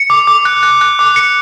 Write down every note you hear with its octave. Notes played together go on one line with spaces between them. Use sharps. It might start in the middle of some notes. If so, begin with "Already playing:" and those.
Already playing: C#7
D6
D6
F#6
F#6
F#6
D6
C#7